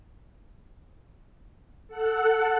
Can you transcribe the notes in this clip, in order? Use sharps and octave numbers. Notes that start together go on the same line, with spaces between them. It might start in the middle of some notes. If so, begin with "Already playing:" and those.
A4 F#5